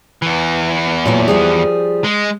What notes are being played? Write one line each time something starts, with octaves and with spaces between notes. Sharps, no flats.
E2 E3
A#2 F#3 A3
F3 G3 G#4
G#3